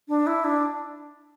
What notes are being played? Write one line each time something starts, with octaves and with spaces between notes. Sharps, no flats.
D4
E4
D4